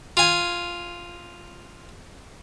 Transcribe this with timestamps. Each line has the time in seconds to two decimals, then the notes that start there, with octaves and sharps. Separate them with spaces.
0.17 F4 G#5